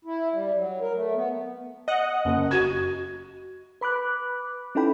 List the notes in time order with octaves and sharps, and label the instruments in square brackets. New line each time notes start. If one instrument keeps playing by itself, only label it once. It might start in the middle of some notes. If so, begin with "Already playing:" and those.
[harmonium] E4
G3
F#3
A#4
A3
B3
[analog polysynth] D#5 F#5
[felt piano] F#1
[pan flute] F#4 [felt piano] G#6 D#7
[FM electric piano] B4 B5 D6 F#6
C#4 D#4 E4 A4 G5 B5